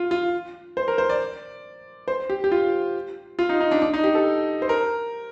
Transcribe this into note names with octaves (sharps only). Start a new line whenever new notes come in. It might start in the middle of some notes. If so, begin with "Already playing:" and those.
Already playing: F4
F4
C5
A#4
C5
D5
C5
G4
G4
F4
F4
D#4
D#4
D4
D4
D#4
G4
A4
C5
A#4